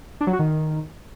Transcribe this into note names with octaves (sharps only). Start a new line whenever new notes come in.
D4
F#3
F#4
D#3